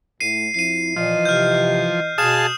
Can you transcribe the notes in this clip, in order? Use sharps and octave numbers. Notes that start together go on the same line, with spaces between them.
A2 C7 D#7
F2 F3 E4 C7 D#7
A#2 E3 F3 D#5
C3 F6 G6
B2 G#4 F5 A5 D#6 E7